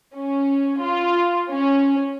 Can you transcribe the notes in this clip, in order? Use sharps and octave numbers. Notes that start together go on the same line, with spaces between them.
C#4
F4
C#4